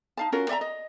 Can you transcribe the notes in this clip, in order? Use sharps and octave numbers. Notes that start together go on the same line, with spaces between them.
D#4 F5 A5
C#4 F4 F#4 A#4
D5 E5 A5 A#5
D#5